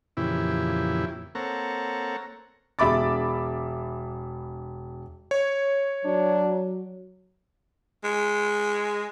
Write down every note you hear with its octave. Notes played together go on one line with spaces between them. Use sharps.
F2 A#2 C#3 E3 E4 G4
A#3 C4 A4 C#5 F#5 A#5
E1 E5 B5 D6 A6
C#5
F#3 D4
G#3